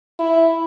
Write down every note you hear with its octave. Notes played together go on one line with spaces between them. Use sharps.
E4